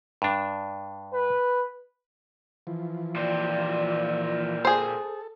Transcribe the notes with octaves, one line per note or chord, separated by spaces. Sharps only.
G2 D4
B4
E3 F3
A#2 C4 D5
G#4 A4 C5